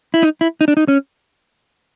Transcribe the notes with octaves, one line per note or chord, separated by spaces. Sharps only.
E4
D#4
E4
D#4
D4
D#4
C#4